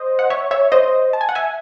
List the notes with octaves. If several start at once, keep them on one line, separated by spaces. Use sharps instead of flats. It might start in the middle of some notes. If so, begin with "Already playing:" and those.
Already playing: C5 D#5
F#5
C#5 E5
C#5 E5
C5 D#5
A5
G#5
F#5
E5 G#5